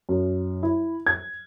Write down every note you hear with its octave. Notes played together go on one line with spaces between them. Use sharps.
F#2
E4
G#6